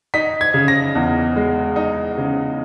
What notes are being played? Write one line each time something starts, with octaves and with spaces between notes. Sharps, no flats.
D#4 B6
G#6
C#3
A#6
E2
G#3
D#4
C#3